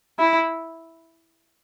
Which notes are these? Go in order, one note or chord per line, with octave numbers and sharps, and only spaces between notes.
E4